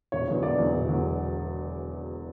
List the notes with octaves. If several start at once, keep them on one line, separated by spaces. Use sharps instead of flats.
E1 C#5
E2 D3 F#3 C#5
E1 D5
E2 D3 F#3
E1
E2 D3 F#3